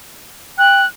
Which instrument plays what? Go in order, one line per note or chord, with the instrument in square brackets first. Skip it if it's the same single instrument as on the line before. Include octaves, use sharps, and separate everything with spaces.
[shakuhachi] G5 [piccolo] F#6